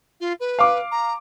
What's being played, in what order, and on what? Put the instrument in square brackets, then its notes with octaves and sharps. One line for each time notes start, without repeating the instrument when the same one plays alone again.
[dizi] F4
B4
[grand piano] F5 D6
[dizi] A#5